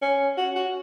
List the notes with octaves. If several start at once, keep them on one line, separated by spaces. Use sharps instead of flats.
C#4
F#4
F#4